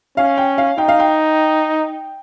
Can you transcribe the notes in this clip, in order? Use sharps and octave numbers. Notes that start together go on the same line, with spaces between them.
C#4 F5
G5
F5
D#4 G5
F5
G5